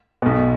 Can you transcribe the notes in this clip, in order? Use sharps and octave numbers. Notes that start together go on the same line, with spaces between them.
B1 B2